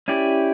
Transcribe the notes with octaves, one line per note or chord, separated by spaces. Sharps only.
C#4 E4 G4 D5